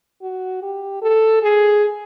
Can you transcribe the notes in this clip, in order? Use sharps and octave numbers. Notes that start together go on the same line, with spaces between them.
F#4
G4
A4
G#4